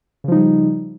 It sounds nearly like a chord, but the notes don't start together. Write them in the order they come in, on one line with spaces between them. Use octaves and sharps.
C#3 F3 D#4 G3